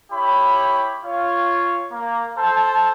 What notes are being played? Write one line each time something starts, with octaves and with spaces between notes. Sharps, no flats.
E4 G4 C#5 B5
F4 C#5
A#3
A4 C5 A5